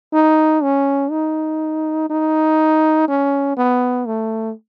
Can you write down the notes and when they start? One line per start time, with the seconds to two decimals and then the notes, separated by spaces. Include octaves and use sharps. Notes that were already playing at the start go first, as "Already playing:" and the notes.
0.13 D#4
0.63 C#4
1.11 D#4
2.10 D#4
3.08 C#4
3.57 B3
4.06 A3